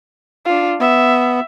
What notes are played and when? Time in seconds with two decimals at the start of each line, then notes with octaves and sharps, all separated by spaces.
0.45 D4 F4
0.80 B3 E5